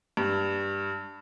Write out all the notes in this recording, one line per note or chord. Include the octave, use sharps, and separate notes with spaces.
G2